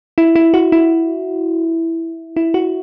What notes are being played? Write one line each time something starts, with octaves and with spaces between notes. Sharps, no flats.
E4
E4
F#4
E4
E4
F#4